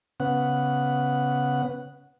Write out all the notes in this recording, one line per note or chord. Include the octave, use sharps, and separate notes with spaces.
C#3 B3 F#5